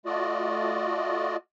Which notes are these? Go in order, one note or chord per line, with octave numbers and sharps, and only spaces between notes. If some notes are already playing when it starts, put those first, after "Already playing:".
A3 F4 F#4 D5 D#5